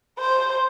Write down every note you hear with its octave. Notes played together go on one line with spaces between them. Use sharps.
C5